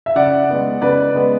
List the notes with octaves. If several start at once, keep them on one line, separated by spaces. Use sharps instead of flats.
E5
C#3 D5 F#5
G#3 B3
C#3 B4 D5
G#3 B3